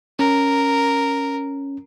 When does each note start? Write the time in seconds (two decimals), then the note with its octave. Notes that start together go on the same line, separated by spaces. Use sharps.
0.19 C#4 A#4